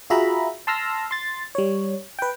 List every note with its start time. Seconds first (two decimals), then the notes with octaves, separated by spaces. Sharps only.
0.10 F4 F#4 G#4 E5 A#5 B5
0.67 A5 C6 E6 F6 A#6
1.11 C6 A6
1.55 G3 C#5
2.19 B4 G5